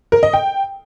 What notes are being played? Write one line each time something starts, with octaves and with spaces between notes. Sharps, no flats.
A#4
D#5
G5